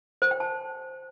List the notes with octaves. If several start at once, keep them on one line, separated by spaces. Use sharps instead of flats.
C5
G5
A5